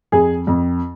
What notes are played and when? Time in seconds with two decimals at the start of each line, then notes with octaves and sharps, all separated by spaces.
0.12 F2 G#4
0.47 F2